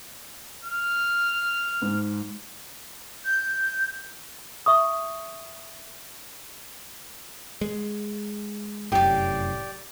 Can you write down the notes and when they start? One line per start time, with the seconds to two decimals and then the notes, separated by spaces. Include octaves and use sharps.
0.65 F6
1.82 G#2
3.25 G6
4.66 E5 C#6 D#6
7.61 G#3
8.92 F1 F#2 A2 G4 D5